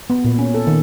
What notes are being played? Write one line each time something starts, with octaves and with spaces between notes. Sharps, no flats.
B3
A#2
C#4
A4
D#3